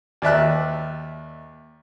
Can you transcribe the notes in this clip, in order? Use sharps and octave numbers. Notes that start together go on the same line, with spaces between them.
D#2 D5 E5 F#6